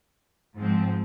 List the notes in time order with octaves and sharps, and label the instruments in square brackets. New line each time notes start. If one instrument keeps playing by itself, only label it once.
[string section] G#2 F3 C4